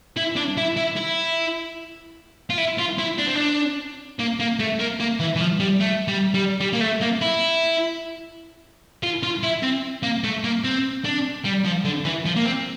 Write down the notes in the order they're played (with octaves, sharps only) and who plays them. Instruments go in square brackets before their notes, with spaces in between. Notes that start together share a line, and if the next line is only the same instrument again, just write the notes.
[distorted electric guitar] E4
D4
E4
E4
E4
F4
E4
F4
E4
D4
C4
D4
A#3
A#3
A3
A#3
A#3
E3
E3
F3
G3
A3
G3
G3
G3
A#3
A3
A#3
E4
F4
F4
E4
C4
A#3
A3
A#3
C4
D4
G3
F3
D3
E3
F3
A#3
C4